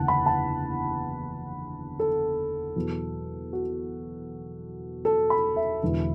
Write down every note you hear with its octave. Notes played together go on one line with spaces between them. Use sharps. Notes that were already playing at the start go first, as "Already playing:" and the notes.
Already playing: F#1 E2 D3 F#5 A5
B5
A5
A4
E2 B2 F#3
F#4
A4
B5
E5
E1 E2 D3 F#3